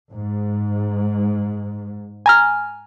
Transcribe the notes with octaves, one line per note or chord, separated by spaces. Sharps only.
G#2
G#5 A#5 F6